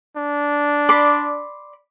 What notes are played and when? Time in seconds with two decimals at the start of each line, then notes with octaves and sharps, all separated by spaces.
0.17 D4
0.89 D5 B5 C6